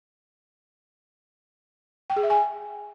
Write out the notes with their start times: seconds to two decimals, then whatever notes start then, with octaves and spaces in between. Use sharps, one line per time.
2.10 G5
2.16 G#4
2.23 E5
2.30 G#5